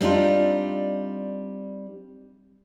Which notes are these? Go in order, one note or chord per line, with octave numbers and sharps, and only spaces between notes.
G3 C4 D4 D#4 F4